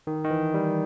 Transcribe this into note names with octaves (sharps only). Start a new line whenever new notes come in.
D#3
D#3
E3
G3